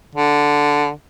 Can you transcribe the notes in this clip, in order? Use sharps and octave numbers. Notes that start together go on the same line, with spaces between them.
D3